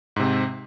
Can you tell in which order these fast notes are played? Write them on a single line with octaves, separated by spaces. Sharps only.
G#2 C3 C4